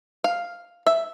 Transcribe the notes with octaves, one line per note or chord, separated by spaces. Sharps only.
F5
E5